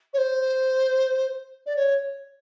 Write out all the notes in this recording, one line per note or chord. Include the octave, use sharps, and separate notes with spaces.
C#5
C5
D5
C#5